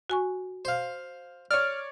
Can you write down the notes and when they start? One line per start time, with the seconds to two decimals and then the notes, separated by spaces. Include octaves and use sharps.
0.10 F#4 G#5 C#6
0.65 C5 F5
1.51 C#5 D5 F6